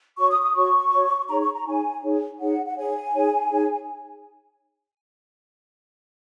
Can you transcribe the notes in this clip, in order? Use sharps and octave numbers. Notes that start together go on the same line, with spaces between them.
F#4 C#5 C#6
D#6
D#6
F#4 C#5 C#6
F#4 C#5
D#4 G#4 C#5 A#5
C#6
A#5
D#4 G#4 C#5 G#5
D#4 G#4 C#5
D#4 G#4 C#5 F#5
F#5
D#4 G#4 C#5 G#5
D#4 G#4 C#5
D#4 G#4 C#5